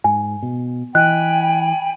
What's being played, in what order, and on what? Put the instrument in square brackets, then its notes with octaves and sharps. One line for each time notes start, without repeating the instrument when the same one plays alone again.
[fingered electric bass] G#2 [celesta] G#5
[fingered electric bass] B2
[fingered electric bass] E3 [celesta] D#5 F#6 [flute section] G5 G#5 B5